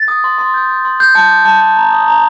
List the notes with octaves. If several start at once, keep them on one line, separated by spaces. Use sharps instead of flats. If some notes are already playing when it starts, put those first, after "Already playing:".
Already playing: A6
D#6
C6
C6
G6
G6
C6
G6
A5
D6
A5
G6
A#5
D#6
A#5